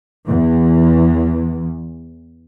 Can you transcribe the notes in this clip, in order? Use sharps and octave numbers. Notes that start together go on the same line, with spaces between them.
E2 E3